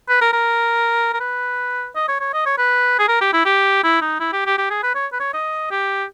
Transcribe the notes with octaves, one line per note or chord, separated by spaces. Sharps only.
B4
A#4
A#4
A#4
B4
D#5
C#5
C#5
D#5
C#5
B4
G#4
A#4
G4
E4
G4
E4
D#4
E4
G4
G4
G4
G#4
B4
C#5
B4
C#5
D#5
G4